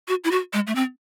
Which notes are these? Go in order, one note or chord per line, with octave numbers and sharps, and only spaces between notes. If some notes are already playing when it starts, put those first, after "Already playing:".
F#4
E4
F#4
G#3
A3
C4